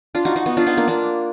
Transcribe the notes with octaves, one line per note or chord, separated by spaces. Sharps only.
D4 F4
D#4 F#4
D#4 F#4
B3 D#4
D4 F4
B3 D#4
A#3 D4
A#3 D4